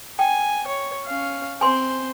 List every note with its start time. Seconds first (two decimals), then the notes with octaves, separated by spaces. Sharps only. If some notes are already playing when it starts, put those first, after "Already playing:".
0.19 G5 G#5
0.67 C#5
1.06 C#4 F5
1.61 C4 C5 G#5 C6